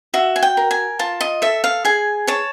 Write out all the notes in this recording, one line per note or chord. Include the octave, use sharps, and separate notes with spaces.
F#4 E5
G#5
G5
A#4
G#5
F4 A5
D#5
A4 E5
F5
G#4 G#5
C#5 A5